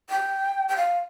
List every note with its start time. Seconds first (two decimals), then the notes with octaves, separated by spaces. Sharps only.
0.10 G5
0.69 G5
0.77 F5